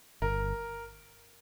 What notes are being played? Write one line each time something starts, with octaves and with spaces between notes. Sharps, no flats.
G1 A#4